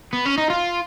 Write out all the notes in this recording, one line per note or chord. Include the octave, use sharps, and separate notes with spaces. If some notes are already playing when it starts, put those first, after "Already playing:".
B3
C#4
D#4
F4